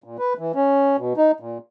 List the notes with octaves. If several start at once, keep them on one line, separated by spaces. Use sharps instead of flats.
A#2
B4
E3
C#4
B2
D#4
A#2